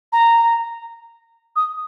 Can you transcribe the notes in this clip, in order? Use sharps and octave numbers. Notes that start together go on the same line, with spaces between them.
A#5
D#6